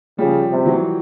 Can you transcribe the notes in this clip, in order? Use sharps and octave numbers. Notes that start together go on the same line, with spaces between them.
C#3 F3 G3
C3 G3
E3 F#3